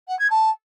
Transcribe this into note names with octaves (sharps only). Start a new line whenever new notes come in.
F#5
G#6
A5